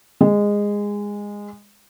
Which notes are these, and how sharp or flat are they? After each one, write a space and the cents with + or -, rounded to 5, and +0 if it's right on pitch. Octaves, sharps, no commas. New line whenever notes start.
G#3 -15